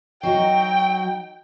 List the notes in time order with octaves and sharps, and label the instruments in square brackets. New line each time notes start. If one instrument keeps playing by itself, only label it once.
[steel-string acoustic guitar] F#3 D#4 F#4 [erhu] G5